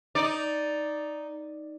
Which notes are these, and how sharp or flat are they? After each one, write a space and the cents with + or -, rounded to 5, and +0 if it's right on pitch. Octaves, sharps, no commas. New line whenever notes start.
D#4 +0 D5 +0